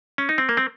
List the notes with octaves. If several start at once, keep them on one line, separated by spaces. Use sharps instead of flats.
C#4
D#4
C4
A#3
C4